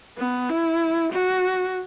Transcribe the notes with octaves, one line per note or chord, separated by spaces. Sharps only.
B3
E4
F#4